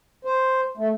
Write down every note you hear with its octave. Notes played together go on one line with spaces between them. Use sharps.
C5
A3